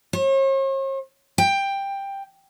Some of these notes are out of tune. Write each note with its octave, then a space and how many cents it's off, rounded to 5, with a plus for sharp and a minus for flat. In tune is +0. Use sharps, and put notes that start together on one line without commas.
C#5 -45
G5 +10